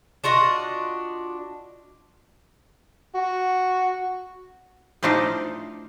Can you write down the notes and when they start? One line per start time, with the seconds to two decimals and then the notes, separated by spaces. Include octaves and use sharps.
0.24 D4 F4 F#4 D#5
3.15 F#4
5.03 A2 F3 A3 D4 D#4 F5